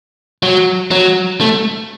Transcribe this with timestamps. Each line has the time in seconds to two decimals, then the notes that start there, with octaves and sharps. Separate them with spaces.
0.43 F#3
0.91 F#3
1.41 A3